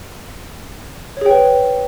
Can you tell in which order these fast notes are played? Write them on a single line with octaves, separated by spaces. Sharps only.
C#5 G#4 G5 B4